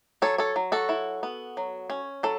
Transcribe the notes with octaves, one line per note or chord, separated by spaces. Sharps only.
F#3 A4 C#5
A4 C#5
F#3
F#4 A4
E4
B3
F#3
C#4
F#3 A4